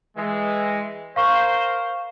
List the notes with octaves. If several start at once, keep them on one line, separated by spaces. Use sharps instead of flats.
E3 G#3
A#4 C5 F5 C#6